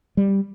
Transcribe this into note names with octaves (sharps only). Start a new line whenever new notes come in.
G3